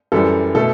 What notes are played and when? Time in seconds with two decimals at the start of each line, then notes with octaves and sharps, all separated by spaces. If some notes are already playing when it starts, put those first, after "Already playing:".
0.12 F#2 E3 G3 A4
0.55 B2 A3 A4